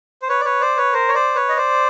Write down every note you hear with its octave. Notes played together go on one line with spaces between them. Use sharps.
C5
B4 C#5
D5
B4 C#5
C5 D5
B4 C#5
A#4 C5
C#5
C5 D5
B4 C#5
D#5
C5 D5